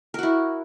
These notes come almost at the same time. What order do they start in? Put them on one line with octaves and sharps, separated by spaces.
A#4 F#4 E4